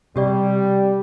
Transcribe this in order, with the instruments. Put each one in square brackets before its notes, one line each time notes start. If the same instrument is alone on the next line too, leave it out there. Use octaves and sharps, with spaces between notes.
[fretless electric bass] C3 [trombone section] G3 [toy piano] F#4 G4 D5